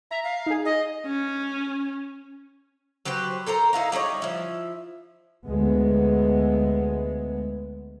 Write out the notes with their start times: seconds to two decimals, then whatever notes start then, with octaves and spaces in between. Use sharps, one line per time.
0.11 E5 A#5
0.24 F5
0.46 D#4 G#4
0.65 D#5
1.06 C#4
3.05 F#3 G4 B4 C5
3.46 A4 A#4 C5 A#5
3.73 D#4 E4 F5 A#5
3.92 G3 D#4 G#4 C#5
4.22 F3 E4
5.45 D2 G#3 B3